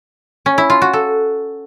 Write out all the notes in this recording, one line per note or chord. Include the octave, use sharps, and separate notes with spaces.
C#4
E4
F4
F#4
A4